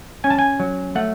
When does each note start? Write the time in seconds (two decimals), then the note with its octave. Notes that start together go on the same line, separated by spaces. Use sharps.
0.24 C#4 G#5
0.30 A5
0.39 G#5
0.60 F#3
0.95 A3 F#5